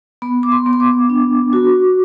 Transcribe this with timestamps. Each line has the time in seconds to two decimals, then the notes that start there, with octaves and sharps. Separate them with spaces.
0.22 B3 B5
0.43 D6
0.52 C6
0.66 B3
0.73 C6
0.80 D6
1.10 D4
1.53 F#4